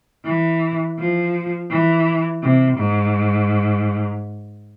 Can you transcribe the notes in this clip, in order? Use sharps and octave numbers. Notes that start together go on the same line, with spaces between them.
E3
F3
E3
C3
G#2